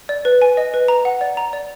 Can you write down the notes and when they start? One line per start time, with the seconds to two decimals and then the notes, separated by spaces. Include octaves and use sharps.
0.09 D5
0.25 B4
0.42 G#5
0.57 D#5
0.74 B4
0.88 A#5
1.05 F#5
1.21 D5
1.37 A#5
1.53 D5